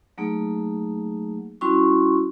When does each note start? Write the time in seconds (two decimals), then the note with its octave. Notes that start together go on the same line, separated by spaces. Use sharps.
0.18 F#3 A3 A#3 D#4 G#4
1.61 G3 C#4 E4 F#4 C6 C#6